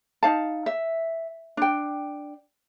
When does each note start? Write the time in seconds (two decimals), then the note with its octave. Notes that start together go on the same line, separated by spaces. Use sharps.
0.23 D#4 F5 A5
0.66 E5
1.57 D4 G5